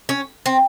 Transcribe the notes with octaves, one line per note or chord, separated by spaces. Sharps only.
C#4
C4